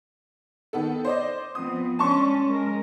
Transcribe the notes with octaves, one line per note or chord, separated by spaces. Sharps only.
D#3 B3 A4
C5 D5 D#5
F3 B3 C4 D#6
G#3 C#4 D4 A5 C6 C#6
G#3 A#4